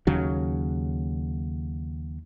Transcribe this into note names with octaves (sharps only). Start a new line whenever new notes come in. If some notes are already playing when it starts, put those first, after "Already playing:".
D#2 C#3 F#3